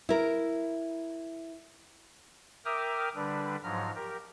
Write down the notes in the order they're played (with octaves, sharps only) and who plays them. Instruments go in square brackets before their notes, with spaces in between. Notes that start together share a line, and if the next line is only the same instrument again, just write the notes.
[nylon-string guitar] E4 A#4
[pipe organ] A#4 E5 G5 D6 D#6 F6
D3 G3 D4 B4
G#2 F3 F#3 A#5 F6
G4 A#4